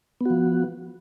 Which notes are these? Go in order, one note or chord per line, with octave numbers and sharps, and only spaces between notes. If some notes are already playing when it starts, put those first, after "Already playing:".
F3 B3 F#4